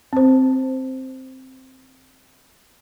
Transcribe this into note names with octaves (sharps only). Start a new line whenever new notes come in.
C4 C5